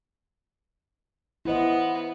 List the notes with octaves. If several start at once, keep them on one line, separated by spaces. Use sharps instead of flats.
B3 E4 C5 D#5